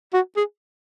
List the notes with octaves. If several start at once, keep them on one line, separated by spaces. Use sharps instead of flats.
F#4
G#4